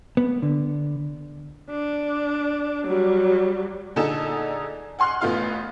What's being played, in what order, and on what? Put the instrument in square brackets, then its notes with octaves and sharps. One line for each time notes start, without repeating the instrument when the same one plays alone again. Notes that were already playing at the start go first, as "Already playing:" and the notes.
[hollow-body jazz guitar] B3
D3
[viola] D4
F#3 G3
[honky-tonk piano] A#2 D3 D#4 G#4 A4 E7
F#5 G#5 C6 F6 F#6
A1 A3 B3 F4 F5 F6